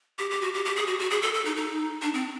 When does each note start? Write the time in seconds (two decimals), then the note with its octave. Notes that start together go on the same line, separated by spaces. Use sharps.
0.19 G4
0.31 G4
0.41 F#4
0.54 G4
0.65 G4
0.76 G#4
0.87 F#4
0.99 F#4
1.10 G#4
1.22 A4
1.34 A4
1.45 D#4
1.56 D#4
2.02 D4
2.14 C4